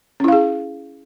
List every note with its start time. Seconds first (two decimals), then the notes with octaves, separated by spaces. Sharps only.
0.20 C#4
0.24 E4
0.28 F5
0.32 G#4